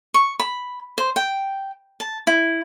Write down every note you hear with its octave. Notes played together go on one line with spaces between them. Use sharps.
C#6
B5
C5
G5
A5
E4